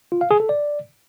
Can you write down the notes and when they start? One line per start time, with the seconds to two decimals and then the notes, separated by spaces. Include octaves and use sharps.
0.12 F4
0.21 F5
0.31 G#4
0.40 A4
0.49 D5